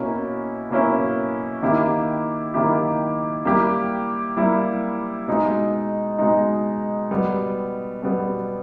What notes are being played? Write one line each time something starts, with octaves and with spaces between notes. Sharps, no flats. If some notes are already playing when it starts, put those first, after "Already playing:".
Already playing: B2 A#3 C#4 E4
B2 A#3 C#4 E4
D#3 A#3 E4 G4
D#3 A#3 E4 G4
G3 A#3 E4 G4
G3 A#3 E4 G4
B2 G#3 D#4
B2 G#3 D#4
B2 G3 B3
B2 G3 B3